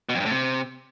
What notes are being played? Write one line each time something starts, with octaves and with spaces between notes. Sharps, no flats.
B2
F2
G2
A2
C3